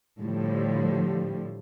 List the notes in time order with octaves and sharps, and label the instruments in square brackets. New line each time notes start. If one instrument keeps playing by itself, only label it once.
[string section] A2 D3 F3 G3